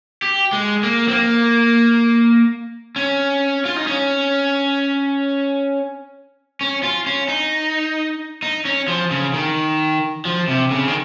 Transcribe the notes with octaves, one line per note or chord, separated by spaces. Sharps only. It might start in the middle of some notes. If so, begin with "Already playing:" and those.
G4
G#3
A#3
C4
A#3
C#4
F4
D#4
C#4
C#4
F4
C#4
D#4
D#4
C#4
F3
C#3
D#3
F3
C3
C#3
D#3